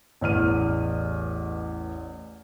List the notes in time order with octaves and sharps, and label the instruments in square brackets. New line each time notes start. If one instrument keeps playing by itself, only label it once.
[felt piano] A1 E2 F6 D#7